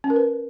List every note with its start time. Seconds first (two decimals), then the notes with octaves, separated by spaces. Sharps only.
0.04 C#4
0.10 A#4
0.16 B4